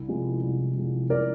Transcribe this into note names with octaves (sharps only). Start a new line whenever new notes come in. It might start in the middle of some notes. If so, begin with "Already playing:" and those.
Already playing: C2
C3 F3 G#3
C2
C3 F3 G#3
C2 A#4 D5